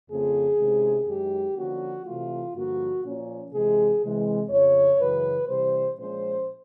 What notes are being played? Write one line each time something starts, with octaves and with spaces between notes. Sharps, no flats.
F2 C#3 F3 A3 C4 G#4
C3 D#3 G#3 C#4
F#2 D#3 G#3 G4
D3 F3 A#3 C#4 F#4
C3 E3 A3 F4
G2 D3 F3 A#3 F#4
A#2 F3 A#3 C#4
C3 E3 G#3 G#4
C3 E3 G#3
F2 C#3 F3 C#5
F#2 C#3 E3 B4
C3 E3 G3 C5
A#2 F3 G#3 C#4 C5